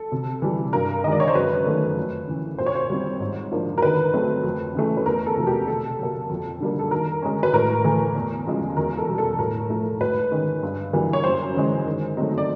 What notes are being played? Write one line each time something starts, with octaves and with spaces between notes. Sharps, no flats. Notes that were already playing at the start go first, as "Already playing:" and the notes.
Already playing: A4
C3
E3 G3
G2 A#4
D#3 G#3 D#5
D5
C#5
C5
F#2 B4
D#3 F#3 A3
F2
C#3 E3
A#2 C5
C#5
C5
G3 C4
G#2
F3 A#3 D4
A#4
D#3 B4
F#3 A3 C4
F2
C#3 E3 A3
B4
E2 A#4
A4
C3 F3 A3
G4
B2 A4
F#3 A#3
F2
D3 G3 A#3
A4
D#3 A#4
G#3 C#4
B4
A2 A#4
E3 A3
E2
C#3 F3 G#3
E2 A#4
A4
B2 G3
A4
A2 A#4
F3 A3
G#2 B4
D#3 G#3 C#4
G2
E3 G3 A#3
C#5
F#2 C5
C#3 E3 G#3
D#3
F#3 A3 C4 D#4
D5